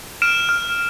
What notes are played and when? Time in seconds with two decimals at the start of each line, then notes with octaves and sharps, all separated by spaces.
0.22 F6 D7 E7
0.49 F6